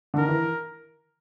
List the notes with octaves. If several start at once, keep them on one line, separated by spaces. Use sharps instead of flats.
D3
D#3 A#4
E3